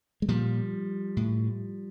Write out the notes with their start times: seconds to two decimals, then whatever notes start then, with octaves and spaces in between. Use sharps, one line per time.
0.22 G#3
0.28 A#2 F3 G3
1.17 A2